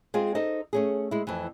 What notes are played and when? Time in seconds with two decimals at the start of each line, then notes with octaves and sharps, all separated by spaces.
0.14 G#3 C4 F4 G#4 C5
0.35 D#4 A4 C5 D#5
0.73 A3 C#4 G#4
1.11 G#3 E4
1.27 F2 E3